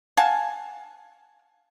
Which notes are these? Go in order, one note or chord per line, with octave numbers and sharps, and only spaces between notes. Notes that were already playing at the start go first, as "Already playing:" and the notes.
F5 F#5 G#5 A5